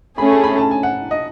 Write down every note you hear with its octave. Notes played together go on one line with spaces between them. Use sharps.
A3 C#4 G#4 B5
A5
B5
A5
G#5
F#5
D#5